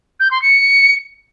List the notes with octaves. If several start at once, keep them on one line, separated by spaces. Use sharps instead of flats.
G6
C6
C#7